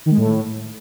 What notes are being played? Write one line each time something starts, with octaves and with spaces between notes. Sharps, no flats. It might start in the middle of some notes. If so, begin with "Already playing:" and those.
D#3
G#3
A2